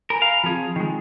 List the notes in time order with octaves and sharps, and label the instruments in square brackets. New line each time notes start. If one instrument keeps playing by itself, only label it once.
[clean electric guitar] A#4 [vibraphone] G#5 A#5 B5
[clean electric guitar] F5
[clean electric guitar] F3 G#4 [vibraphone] C4 F4
[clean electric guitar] D#3 G#3